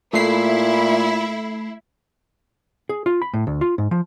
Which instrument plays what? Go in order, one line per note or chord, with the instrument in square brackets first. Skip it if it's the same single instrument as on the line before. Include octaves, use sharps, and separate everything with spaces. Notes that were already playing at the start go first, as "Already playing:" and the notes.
[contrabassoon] A#2 [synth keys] A3 C7 [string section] E4
[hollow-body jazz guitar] G#4
F4
B5
A2
D2
F4
G#2
F3